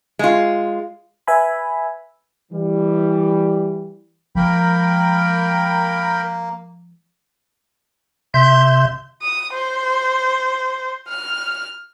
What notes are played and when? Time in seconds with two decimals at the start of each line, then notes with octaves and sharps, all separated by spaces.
0.19 G#3 F4
1.27 B4 E5 G#5 B5
2.52 E3 G3
4.35 F3 G#3 A#3 A#4 G5 B5
8.34 C3 E5 C6 G6
9.22 D#6
9.54 C5
11.08 F6